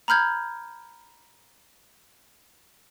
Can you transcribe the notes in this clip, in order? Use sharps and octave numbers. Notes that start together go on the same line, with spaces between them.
A#5 B5 F6 G6 G#6